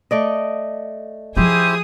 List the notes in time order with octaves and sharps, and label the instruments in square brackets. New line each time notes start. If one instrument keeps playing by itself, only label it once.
[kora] A3 D5 D#5
[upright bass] F3 F4 [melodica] E4 G4 C5 [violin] G#4 D#6